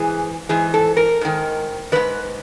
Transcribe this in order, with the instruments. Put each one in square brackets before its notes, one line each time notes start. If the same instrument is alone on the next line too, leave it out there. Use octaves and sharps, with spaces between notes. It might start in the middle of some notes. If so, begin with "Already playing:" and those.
Already playing: [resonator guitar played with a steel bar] G#2 E3 G#4
G#2 E3 G#4
A4
A#4
G#2 D#3
G#2 D#3 B4